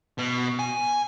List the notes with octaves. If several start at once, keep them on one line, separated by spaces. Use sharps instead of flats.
B2
G#5